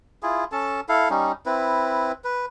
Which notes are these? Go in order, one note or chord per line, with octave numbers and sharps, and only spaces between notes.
E4 F4 G#4
C#4 A4 A5
E4 A4 F5
G3 C#4 D#4
C4 E4 B4
B4